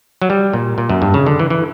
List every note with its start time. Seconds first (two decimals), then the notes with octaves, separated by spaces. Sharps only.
0.22 F#3
0.30 G3
0.53 A#2
0.78 A#2
0.90 F#2
1.02 G2
1.14 C#3
1.26 D3
1.39 E3
1.50 E3